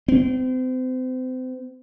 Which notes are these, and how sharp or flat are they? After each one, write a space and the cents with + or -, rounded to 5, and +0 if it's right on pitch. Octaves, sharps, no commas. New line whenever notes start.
C4 -35